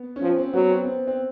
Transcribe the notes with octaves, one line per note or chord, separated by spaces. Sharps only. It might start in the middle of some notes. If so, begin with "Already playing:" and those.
Already playing: B3
C#4
F3 C4
C4
F#3 B3
C4
C4
C4